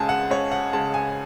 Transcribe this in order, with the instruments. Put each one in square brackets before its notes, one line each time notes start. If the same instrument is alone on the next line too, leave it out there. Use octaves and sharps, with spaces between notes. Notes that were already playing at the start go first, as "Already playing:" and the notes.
Already playing: [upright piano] C#2 C#3 G#3 G#5 A5
F#5
C#2 C#5
F#5
C#3 G#3 A5
G#5